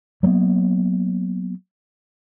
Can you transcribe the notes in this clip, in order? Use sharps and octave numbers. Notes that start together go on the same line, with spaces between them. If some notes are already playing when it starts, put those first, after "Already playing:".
F#3 G3 A#3 B3